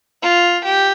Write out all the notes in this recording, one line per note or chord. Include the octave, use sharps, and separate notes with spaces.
F4
G4